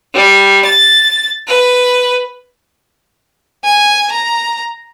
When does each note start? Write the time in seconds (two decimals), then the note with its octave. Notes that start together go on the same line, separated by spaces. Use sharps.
0.15 G3
0.66 A6
1.47 B4
3.65 G#5
4.11 A#5